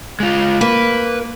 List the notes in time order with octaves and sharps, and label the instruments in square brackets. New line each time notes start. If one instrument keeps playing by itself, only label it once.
[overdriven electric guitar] G#3 F4
[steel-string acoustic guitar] A#3 [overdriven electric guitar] B4